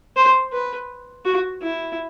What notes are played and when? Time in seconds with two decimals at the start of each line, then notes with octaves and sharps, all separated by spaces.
0.16 C5
0.53 B4
1.25 F#4
1.62 E4